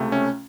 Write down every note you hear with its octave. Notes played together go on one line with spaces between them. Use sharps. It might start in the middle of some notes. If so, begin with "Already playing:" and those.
Already playing: C#2 C3 A3
C#4